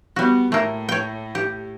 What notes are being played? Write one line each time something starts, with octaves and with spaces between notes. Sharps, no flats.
G3 B3 F#4
A2 A3 A#3
C#5 G5
G4